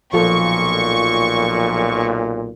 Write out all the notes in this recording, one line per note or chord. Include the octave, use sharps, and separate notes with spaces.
B1 A#2 F3 F4 A4 C#6